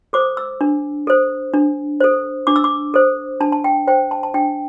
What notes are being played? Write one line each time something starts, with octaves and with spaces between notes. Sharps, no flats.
A4 C5 D6
E6
D4
A4 C5
D4
A4 C5
D4 D6
E6
D6
A4 C5
D4 A5
A5
G5
C5 G5
A5
A5
D4 G5